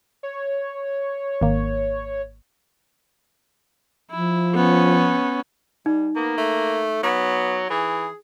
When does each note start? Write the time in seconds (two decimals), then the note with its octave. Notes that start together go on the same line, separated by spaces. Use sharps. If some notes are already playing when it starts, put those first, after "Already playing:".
0.23 C#5
1.41 G#1 A#3
4.11 F3 E4
4.54 B3 C#4
5.86 G3 D#4
6.16 A#3 B3
6.37 A3
7.03 F#3 B3
7.70 E3 G#4